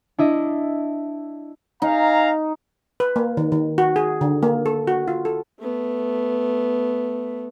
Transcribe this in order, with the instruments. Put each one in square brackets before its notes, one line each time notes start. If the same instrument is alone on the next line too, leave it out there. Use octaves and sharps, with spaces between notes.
[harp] D4 E4 D#5
[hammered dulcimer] D#4 [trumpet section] F5 G#5 A#5
[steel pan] B4
A#3
D#3
D#3
F#4
G#4
D3
A#3
A4
F#4
F4
A4
[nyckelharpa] A3 B3